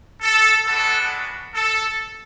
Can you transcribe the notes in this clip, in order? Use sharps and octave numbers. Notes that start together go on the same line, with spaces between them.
A4
G#3 B3 D4 F#4 A4
A4